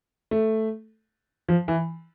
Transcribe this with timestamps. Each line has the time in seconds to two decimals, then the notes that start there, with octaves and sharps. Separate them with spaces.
0.31 A3
1.49 F3
1.68 E3